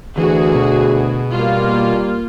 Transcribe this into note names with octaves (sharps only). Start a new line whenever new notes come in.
D2 E3 F#4 G#4
B2
G3 A#3 F4